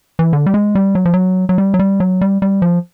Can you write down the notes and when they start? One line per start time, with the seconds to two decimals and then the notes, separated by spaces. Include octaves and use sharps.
0.19 E3
0.33 D3
0.46 G3
0.54 G#3
0.75 G3
0.95 F#3
1.05 F3
1.14 F#3
1.49 F#3
1.58 G3
1.74 F#3
1.79 G3
2.00 F#3
2.21 G3
2.42 G3
2.62 F3